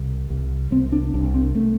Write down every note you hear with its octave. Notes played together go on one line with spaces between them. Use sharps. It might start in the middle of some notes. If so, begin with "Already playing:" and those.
Already playing: C2
C2
C2 C4
D4
C2 D4
C4
A3